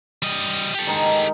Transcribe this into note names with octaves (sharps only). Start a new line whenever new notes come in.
G3 D#5
G4 A4
D#3 G#3 D#4